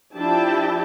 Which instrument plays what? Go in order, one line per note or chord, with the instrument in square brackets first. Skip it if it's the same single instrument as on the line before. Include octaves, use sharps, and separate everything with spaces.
[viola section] F3 D4 E4 G4 G5 A5